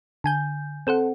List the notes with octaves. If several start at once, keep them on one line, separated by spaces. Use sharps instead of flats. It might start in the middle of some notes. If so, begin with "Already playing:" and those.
D3 G#5 G6
C4 A4 C5 F#5